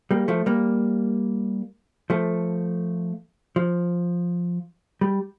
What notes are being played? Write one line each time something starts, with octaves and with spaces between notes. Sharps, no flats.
G3 A#3
F3 A3
G3 A#3
F3 A3
F3
G3